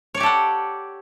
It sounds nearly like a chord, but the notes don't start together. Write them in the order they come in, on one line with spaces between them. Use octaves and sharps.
C#5 D5 G4 A4 F#5